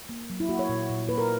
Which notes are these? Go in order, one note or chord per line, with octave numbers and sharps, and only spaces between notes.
A#3
F#3
E4
A#3 F#4
C#5
A#2
A#2
A#3 B4
A#4